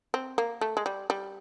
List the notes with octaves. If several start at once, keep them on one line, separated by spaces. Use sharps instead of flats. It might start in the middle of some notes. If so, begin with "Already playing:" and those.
C4
A#3
A3
G#3
G3
G3